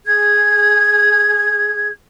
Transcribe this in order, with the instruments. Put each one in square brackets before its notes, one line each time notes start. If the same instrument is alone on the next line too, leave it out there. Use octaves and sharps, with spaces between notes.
[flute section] G#4 G#6